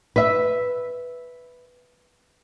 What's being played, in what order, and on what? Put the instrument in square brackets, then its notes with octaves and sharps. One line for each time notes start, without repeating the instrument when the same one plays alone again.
[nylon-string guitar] B4 E5